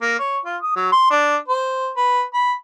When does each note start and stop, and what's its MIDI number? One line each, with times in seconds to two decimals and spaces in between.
0.01 0.16 58
0.19 0.38 73
0.45 0.56 65
0.62 0.74 87
0.76 0.88 54
0.92 1.07 84
1.11 1.36 62
1.48 1.90 72
1.96 2.22 71
2.34 2.53 83